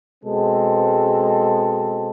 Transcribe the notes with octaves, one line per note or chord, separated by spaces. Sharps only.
B2 G#3 C4 A4